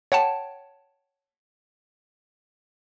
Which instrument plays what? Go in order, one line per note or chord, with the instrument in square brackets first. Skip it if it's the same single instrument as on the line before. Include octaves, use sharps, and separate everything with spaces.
[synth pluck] C#5 F#5 G5 A5